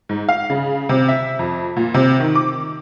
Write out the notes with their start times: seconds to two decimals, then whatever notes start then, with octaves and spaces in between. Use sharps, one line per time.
0.09 G#2
0.28 F5
0.50 C#3
0.89 C3
1.08 E5
1.39 F2
1.76 A#2
1.94 C3
2.20 D#3
2.35 D6